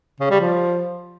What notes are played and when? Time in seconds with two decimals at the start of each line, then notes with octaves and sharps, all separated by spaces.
0.20 C#3
0.30 G3
0.40 F3